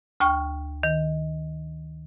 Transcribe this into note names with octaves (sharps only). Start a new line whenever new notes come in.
D2 G5 C#6 F6
D#3